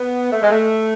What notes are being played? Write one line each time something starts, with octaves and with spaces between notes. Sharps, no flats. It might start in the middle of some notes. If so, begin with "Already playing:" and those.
Already playing: B3
A3
G#3
A3